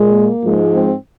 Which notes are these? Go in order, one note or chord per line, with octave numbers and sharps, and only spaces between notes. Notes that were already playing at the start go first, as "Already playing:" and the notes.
Already playing: A#2 G#3
A#3
G#2 F3 G#3
C4